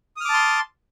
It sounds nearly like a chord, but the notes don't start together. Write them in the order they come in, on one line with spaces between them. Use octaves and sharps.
D#6 F6 D6 A5 C6